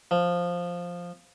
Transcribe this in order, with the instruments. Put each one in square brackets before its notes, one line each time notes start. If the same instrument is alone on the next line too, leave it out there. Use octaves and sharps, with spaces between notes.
[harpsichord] F3